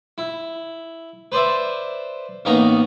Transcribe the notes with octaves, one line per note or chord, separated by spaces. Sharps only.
E4
B4 C5 D5 E5
A1 A#3 B3 D#4 A#5 C#6